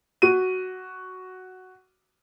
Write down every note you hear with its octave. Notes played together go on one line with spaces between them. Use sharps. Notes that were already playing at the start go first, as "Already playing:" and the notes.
F#4 D#7